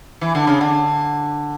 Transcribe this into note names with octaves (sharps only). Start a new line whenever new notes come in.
E3
D3
C#3
D3